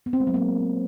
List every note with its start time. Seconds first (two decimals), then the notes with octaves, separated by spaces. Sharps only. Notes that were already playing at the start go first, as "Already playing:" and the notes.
0.06 B3
0.13 C4
0.20 G#3
0.27 F#3
0.34 A#3